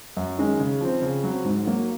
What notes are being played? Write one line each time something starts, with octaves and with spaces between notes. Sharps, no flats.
F#2
D#3 G#3 C#4
C#3
F3 C4
C#3
F#3 C4
G#2
F#3 A#3